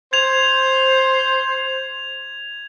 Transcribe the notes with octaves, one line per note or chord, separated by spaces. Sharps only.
C5 G#6 F7